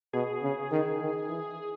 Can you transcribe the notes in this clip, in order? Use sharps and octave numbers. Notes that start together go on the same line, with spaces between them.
B2 G#4
C#3
D#3
D#3
E3